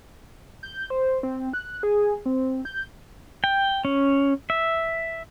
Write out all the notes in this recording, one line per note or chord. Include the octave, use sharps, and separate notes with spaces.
G6
C5
C4
F#6
G#4
C4
G6
G5
C#4
E5